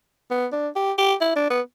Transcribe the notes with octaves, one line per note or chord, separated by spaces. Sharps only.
B3
D4
G4
G4
E4
D4
B3